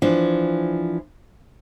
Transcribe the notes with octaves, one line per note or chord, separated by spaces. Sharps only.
E3 F3 D4